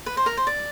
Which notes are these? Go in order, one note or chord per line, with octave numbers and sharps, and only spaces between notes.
B4
C5
A#4
C5
D5